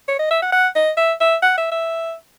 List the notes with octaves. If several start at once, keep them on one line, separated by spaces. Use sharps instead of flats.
C#5
D#5
E5
F#5
F#5
D#5
E5
E5
F#5
E5
E5